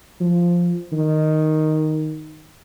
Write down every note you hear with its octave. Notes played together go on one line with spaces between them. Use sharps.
F3
D#3